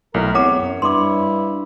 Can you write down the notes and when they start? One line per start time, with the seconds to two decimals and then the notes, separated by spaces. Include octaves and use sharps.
0.14 B1 A2 A#4
0.35 E2 C4 C#5 F#5 A#5 D6
0.61 F#2
0.82 G2 E4 C6 D6